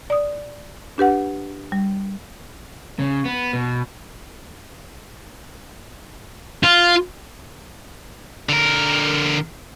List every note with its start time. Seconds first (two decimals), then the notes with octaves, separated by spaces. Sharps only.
0.10 D5 D#6
0.98 D4 G4 B4 F#5
1.72 G3
2.99 C#3
3.25 B3
3.53 B2
6.63 F4
8.49 D3 A#4